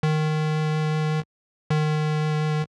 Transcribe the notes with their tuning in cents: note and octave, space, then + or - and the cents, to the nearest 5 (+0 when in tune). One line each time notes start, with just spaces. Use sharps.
D#3 -10
D#3 -25